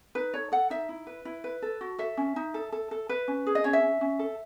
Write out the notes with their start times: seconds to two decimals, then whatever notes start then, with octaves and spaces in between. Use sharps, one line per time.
0.15 D#4 B4
0.34 A4 C#5
0.52 A4 F#5
0.70 D#4 E5
0.89 E4
1.07 B4
1.25 E4
1.44 B4
1.62 A4
1.81 F#4
1.98 A4 E5
2.17 C#4
2.36 D#4
2.54 A4
2.72 A4
2.91 A4
3.09 B4
3.28 C#4
3.46 G#4
3.55 D#5
3.64 C#4 C#5
3.73 E5
3.83 C#4
4.01 C#4
4.19 A4